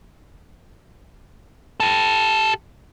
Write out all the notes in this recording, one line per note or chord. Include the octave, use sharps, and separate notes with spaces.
G4 A4